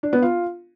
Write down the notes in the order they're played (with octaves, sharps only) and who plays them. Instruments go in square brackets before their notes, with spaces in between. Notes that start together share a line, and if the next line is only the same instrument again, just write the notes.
[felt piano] D4
B3
F4